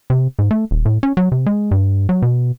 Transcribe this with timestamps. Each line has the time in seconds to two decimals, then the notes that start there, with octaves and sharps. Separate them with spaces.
0.10 C3
0.39 G#2
0.51 A3
0.71 D#1
0.85 A2
1.03 C#4
1.17 F#3
1.32 C3
1.46 G#3
1.71 G2
2.09 F#3
2.22 B2